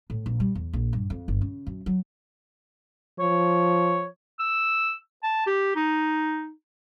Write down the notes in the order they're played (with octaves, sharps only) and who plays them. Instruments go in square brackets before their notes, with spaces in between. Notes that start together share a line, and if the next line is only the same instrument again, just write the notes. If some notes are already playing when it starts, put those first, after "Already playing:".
[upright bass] A2
A#1
G3
E2
A#1
G2
F2
G1
C#3
F#2
F#3
[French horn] F3 [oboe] C#5
[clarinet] E6
A5
G4
D#4